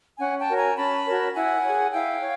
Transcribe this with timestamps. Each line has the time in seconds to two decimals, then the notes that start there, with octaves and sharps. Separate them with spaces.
0.18 C#4 F#5 G#5
0.38 G5 A5
0.48 F#4 A#4 C#5
0.57 G#5 A#5
0.76 C#4 A5 B5
1.05 F#4 A#4 C#5
1.34 E4 F#5 G#5
1.63 G#4 C#5
1.92 E4 F5 G5
2.21 C#5